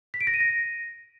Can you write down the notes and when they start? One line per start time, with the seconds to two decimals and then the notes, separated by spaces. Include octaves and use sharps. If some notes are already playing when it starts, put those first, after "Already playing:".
0.14 B6
0.21 D7
0.27 A#6
0.34 D#7
0.40 A#6